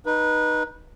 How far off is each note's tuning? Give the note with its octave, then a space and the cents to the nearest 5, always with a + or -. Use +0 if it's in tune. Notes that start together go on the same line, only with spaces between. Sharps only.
D#4 -10 B4 -25